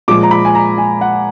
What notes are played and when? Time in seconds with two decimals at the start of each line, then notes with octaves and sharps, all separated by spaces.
0.08 A#2 F3 G#3 D6
0.23 A#5
0.31 B5
0.45 G#5
0.55 A#5
0.78 G#5
1.01 F#5